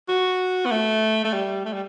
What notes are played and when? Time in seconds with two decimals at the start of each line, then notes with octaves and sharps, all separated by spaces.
0.09 F#4
0.66 B3
0.71 A3
1.25 A3
1.33 G3
1.65 A3
1.73 G3